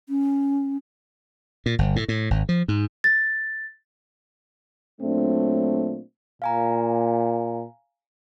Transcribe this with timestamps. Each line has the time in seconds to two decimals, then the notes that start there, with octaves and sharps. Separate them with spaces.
0.09 C#4
1.66 A#2
1.79 G1
1.96 A2
2.08 A2
2.30 G#1
2.49 F3
2.68 G#2
3.04 A6
5.00 A#2 F#3 A3 C4 D4
6.42 A#2 F5 G#5 A#5